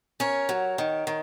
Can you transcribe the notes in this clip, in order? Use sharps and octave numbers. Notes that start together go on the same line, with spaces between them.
C#4 A#4 C#5
F#3
D#3
D#3